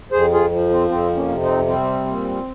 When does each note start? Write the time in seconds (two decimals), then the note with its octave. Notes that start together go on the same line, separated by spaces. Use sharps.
0.12 F2 G#4 C5
0.32 F4 G#4
0.52 F3
0.70 C4
0.89 F2 C4
1.15 A#3 C#4
1.28 C3
1.41 C4 D#4
1.67 G3 C4
2.06 A#2